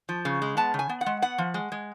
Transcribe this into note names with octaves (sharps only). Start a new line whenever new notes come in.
F3
C#3
G#3
B3 A5
C#3
G#5
B3
F#5
G#3
B3 F#5
F3
G#3
G#3